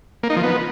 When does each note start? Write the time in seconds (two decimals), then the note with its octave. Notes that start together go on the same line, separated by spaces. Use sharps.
0.23 A#3
0.30 D#4
0.37 F3
0.43 B3